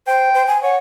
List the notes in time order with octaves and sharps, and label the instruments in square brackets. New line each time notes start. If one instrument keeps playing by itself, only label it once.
[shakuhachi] C5 [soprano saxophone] G5
[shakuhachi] C5
G#5
[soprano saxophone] C#5 [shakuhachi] F#5